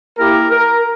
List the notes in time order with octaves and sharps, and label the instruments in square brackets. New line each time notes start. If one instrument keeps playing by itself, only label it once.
[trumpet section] A#3 E4 G4 A#4
A#4